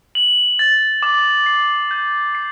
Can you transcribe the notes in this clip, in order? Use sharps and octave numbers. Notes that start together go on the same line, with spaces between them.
F#7
A6
D6
C7
G6
C7